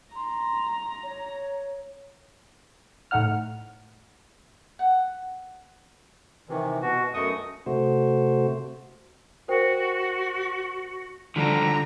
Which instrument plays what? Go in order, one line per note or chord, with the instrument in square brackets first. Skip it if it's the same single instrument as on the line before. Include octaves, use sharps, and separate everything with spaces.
[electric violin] A#5 [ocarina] C6
[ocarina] C#5
[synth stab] A2 A3 D#4 F#5 F6
[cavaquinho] F#5
[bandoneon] C3 D#3 E3
B2 F#4
F#2 A3 D#5 C#6 D#6
[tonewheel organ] C3 A3 F#4 C5
[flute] F#4 [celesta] A#4 C5 G5
[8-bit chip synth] D3 A#5 [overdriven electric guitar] F3 G3